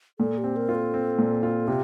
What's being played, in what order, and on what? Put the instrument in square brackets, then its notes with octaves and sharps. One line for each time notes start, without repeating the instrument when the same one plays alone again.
[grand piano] A#2 [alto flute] A4
[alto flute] G4
[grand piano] C4
[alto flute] A#4
[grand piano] F4
[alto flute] A4
[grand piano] C4
A#2
F4
[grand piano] C3 [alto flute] G4